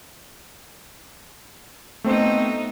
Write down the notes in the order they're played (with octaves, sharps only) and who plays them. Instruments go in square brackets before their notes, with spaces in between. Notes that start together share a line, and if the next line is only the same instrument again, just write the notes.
[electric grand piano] A3 C4 C5 [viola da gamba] B3 D#4